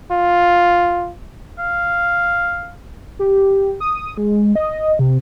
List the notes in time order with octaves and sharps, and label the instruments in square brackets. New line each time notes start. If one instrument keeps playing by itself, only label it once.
[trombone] F4
[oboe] F5
[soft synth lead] G4
D#6
G#3
D#5
C3